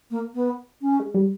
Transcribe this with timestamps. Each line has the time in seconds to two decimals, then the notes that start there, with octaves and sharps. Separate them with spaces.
0.10 A#3
0.34 B3
0.81 C#4
1.00 G#3
1.14 G3